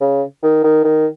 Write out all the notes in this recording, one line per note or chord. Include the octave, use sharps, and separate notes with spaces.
C#3
D#3
D#3
D#3